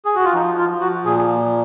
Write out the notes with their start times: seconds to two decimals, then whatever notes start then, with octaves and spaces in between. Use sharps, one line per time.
0.05 G#4
0.15 F#4
0.24 F4
0.34 F3 D#4
0.58 F4
0.69 F3
0.81 F#4
1.05 A#2 G#4